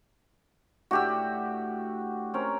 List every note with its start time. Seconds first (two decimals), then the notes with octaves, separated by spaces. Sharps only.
0.91 A2 D4 F#4 G4 E6
2.34 C4 C#4 A#4